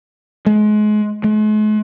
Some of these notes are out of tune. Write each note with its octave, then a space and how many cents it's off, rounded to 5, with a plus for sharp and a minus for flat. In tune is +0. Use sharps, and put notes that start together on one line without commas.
G#3 +30
G#3 +45